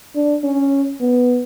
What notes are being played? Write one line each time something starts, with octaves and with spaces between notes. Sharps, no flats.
D4
C#4
B3